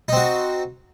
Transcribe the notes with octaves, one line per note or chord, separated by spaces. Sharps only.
C4 D#4 F#4